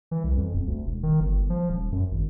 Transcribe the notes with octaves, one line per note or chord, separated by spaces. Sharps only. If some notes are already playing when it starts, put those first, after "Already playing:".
E3
C2
F2
D#1
D2
E1
D#3
G1
F3
D#1
F#2
G#1